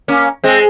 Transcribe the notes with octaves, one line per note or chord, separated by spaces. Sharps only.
A#3 C#4
G#3 C4